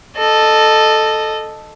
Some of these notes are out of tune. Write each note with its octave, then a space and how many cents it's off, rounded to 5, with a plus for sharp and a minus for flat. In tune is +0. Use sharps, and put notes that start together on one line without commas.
A4 +0 D#5 -20